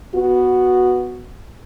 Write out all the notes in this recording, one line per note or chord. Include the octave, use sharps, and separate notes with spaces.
B3 F#4